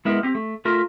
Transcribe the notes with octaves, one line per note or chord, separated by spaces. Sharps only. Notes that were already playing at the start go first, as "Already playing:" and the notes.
G#3 B3 E4 A#4
C4 G4
A3
A3 F4 A#4 E5